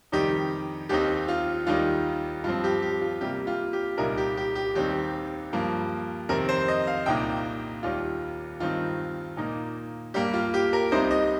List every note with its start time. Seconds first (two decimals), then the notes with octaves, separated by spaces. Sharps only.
0.12 F2 C3 D#3 G3 D#4 G4
0.89 D#2 D#3 C4 D#4 G4
1.28 F4
1.67 D#2 D#3 G3 D#4 F4
2.44 G2 F4
2.47 F3 C4
2.64 G4
2.82 G4
3.01 F4
3.21 C3 G3 A#3 G4
3.47 F4
3.73 G4
3.98 C2 A#2 G3 D#4 A#4
4.17 G4
4.37 G4
4.55 G4
4.75 D#2 D#3 G3 C4 D#4 G4
5.53 G2 F3 A#3
6.29 F2 C3 D#3 C4 A#4
6.49 C5
6.68 D#5
6.87 F5
7.06 C2 A#2 A#3 D#4 G5
7.83 D#2 D#3 G3 F4
8.60 G2 D#3 C4 D#4 F4
9.37 A#2 A#3 D#4
10.14 G2 G3 A#3 G4
10.33 F4
10.54 G4
10.73 A#4
10.92 C2 C3 G3 D#4 C5
11.11 D#5